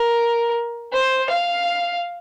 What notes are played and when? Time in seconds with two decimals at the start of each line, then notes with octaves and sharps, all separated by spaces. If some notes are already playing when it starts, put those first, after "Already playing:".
Already playing: A#4
0.93 C5
1.30 F5